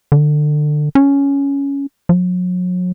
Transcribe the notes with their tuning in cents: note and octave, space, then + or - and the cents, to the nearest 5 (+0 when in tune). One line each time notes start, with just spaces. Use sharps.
D3 +25
C#4 +10
F#3 -40